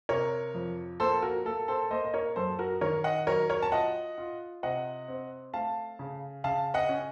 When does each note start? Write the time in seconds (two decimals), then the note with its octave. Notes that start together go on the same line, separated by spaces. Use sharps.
0.09 C3 A#4 C#5
0.54 F2
1.00 A#3 A4 C5
1.23 F#4 A#4
1.46 A#3 A4
1.68 A4 C5
1.91 A#3 C5 D#5
2.05 D#5
2.14 A#4 C#5
2.36 F#2 A4 C5
2.59 F#4 A#4
2.81 D#3 A#4 C#5
3.04 D#5 F#5
3.27 F#3 A#4 C#5
3.49 A#4 C#5
3.62 A5
3.72 F4 D#5 F#5
4.18 F4
4.63 C3 D#5 F#5
5.08 C4
5.54 A3 F5 A5
5.99 C#3
6.44 C#3 F5 A5
6.74 D#5 F#5
6.89 C#4